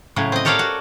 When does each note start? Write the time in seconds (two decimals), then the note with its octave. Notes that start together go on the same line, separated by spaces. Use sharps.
0.16 A2 C#3 F#3
0.32 C4 D#5
0.45 G4 A4 A#4 C#5 D5 F5
0.59 F#4